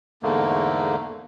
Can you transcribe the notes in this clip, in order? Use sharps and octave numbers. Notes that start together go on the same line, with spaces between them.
E2 G#2 D3 A3 A#3